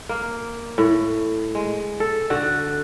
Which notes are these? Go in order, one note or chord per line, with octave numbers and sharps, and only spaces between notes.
A#3
A2
G#3
A4
D3 F#4